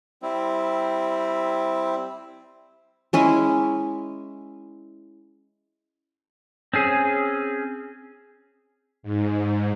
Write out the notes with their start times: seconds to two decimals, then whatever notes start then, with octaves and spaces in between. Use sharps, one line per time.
0.22 G3 C4 E4
3.13 G#3 C#4 E4 G#5
6.74 C4 C#4 G#4
9.03 G#2